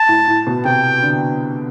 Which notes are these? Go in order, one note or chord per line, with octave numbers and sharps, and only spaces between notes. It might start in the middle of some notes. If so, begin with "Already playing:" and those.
Already playing: A5
A2
A2
B2
C3 G5
D3